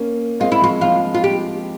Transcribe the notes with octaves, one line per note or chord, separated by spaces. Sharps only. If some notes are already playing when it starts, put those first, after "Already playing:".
Already playing: A#3 C#4
G#3 C4 F4
E4
F3 F4
F3 G#3 F4
F4
G4